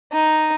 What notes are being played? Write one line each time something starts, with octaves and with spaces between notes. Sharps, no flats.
D#4